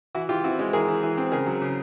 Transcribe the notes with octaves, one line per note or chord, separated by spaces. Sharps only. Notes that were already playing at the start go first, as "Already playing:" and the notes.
E3 E4 F#4
E3 F4 G4
C4 E4 F#4
G#3
E3 G#4 A#4
E3
E3
C4
C#3 G#4 A#4
F#3
C#3